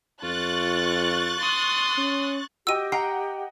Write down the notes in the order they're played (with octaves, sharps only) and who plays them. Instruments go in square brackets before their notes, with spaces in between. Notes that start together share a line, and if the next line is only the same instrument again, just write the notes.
[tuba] F2 [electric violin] F4 [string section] C#6 F#6 A6
[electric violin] C6 D#6
[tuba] C#4
[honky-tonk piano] F#4 D#5 G5 [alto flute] G4 [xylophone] E6 D#7
[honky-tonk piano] D#5 F#5 G5 [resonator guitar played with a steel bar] A#5 [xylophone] C7